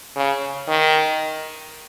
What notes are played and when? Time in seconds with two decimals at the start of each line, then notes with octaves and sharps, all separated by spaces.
0.16 C#3
0.68 D#3